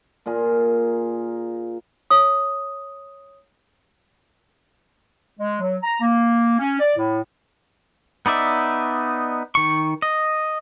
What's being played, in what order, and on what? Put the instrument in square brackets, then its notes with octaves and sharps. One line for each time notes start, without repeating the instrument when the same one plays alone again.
[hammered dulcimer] A#2 F4 G#4 A#4
[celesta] C#5 D#6
[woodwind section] G#3
F#3
A#5
A#3
C#4
D5
A2
[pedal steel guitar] B3 D#4 D5 E5
D#3 C#6
D#5